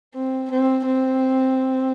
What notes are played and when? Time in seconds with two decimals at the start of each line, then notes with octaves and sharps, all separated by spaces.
0.14 C4
0.50 C4
0.85 C4